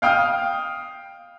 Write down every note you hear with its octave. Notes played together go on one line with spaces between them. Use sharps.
F5 G5 D#6 F6